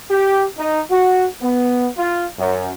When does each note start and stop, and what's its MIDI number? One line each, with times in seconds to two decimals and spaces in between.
0.11 0.43 67
0.57 0.81 63
0.90 1.26 66
1.41 1.87 59
1.97 2.27 65
2.38 2.71 42